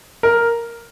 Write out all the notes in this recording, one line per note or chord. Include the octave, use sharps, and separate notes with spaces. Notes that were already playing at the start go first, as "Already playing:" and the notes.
A#4